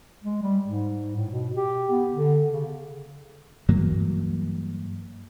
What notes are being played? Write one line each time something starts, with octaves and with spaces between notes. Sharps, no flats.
G#3
G3
G#2
A2
B2
G4
B3
D3
C#3
G2 E3 F#3 A#3